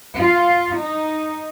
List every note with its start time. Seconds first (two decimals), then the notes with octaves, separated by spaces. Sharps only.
0.18 F4
0.76 D#4